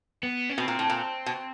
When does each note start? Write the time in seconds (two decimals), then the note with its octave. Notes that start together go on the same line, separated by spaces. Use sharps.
0.23 B3
0.50 C#4
0.58 B2 C4
0.68 A#2
0.79 A2
0.90 A#2
1.26 B2